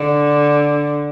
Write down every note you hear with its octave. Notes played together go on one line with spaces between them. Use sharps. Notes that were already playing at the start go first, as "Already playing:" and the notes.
Already playing: D3